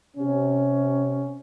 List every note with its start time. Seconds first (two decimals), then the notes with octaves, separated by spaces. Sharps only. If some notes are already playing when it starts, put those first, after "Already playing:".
0.17 C3 C#4